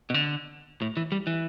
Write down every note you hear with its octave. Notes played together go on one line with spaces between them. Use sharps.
B2
D3
A2
E3
G3
E3